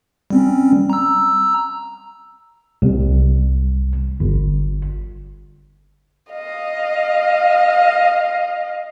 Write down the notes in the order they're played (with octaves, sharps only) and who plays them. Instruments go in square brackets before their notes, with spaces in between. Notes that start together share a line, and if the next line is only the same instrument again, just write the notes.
[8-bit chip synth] G3 C4 C#4
A#5 E6
[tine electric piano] C2
G1
[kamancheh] D#5 F5